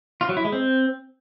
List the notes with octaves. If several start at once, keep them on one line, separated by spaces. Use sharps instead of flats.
F4
F#3
E4
G#3
C4